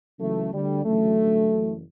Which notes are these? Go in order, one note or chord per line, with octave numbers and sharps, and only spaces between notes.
C#2 C#3 E3 F#3 A3
D2 D3 G3
D2 C#3 E3 F#3 A3
A1 G2 D3
F#1 F#2 E3